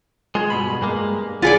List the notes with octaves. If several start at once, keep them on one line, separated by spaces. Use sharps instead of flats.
G#3 F4 G#4
G2 B2 B5
G2 G#3 A#3
B1 B3 F4 G#4 D5